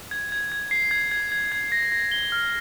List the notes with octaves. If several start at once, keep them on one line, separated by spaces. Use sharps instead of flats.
G#6
G#6
G#6
C7
G#6
G#6
G#6
G#6
A#6
A#6
G7
F6